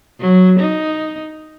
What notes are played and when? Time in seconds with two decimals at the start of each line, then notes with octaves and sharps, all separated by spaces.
0.20 F#3
0.59 D#4